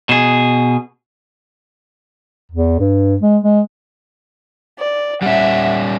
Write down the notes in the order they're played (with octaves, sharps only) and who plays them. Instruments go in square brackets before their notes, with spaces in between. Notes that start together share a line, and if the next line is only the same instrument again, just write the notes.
[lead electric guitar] B2 G#4
[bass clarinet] E2
G2
G#3
G#3
[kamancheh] D5
[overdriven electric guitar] G3 C#4 [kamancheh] E5 F#5